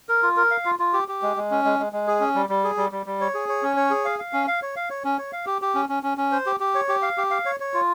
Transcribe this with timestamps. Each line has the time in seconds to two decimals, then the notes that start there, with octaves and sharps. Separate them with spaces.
0.09 A#4
0.23 F4
0.37 A#4
0.51 F5
0.65 F4
0.79 F4
0.93 G4
1.08 G4
1.22 G#3
1.37 G#3
1.51 C#4
1.65 G#3
1.79 G#3
1.93 G#3
2.07 G#4
2.20 C#4
2.35 G3
2.49 G3
2.64 G#4
2.77 G3
2.92 G3
3.06 G3
3.21 C#5
3.35 G#4
3.49 C#5
3.62 C#4
3.77 C#5
3.91 G#4
4.05 F5
4.19 F5
4.33 C#4
4.47 F5
4.62 C#5
4.76 F5
4.90 C#5
5.04 C#4
5.18 C#5
5.32 F5
5.46 G4
5.62 G4
5.75 C#4
5.89 C#4
6.03 C#4
6.18 C#4
6.32 C5
6.46 G4
6.60 G4
6.75 C#5
6.88 G4
7.02 F5
7.18 G4
7.31 F5
7.45 C#5
7.60 C#5
7.74 F4